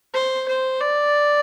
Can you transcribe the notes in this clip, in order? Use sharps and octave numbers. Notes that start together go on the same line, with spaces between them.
C5
C5
D5